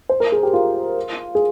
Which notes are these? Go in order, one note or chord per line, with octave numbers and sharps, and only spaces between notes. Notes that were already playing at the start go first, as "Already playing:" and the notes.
C5
A#4
G#4
G4
F4
G#4